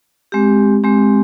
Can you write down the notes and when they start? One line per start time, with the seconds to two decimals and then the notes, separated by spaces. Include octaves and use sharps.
0.32 G#3 C4 G4
0.84 G#3 C4 G4